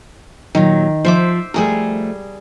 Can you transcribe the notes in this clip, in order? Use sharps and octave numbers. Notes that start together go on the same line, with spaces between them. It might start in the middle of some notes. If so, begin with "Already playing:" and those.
A#2 D#3 F#3
F3 C5 E5 D6
F2 G3 A3 G#4 A#4